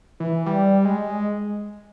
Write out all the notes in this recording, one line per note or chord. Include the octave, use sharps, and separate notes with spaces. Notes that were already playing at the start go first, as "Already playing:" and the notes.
E3
G3
G#3